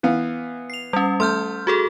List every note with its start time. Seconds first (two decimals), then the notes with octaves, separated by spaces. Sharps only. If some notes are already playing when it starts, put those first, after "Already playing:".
0.03 E3 B3 F5
0.70 C7 F7
0.93 G3 C#4
1.20 A3 C6 F6 G6
1.67 F#4 G#4 A4